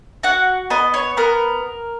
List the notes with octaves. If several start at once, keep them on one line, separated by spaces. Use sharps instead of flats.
F#4 F#5
B3 D#5
C#5
B3 A#4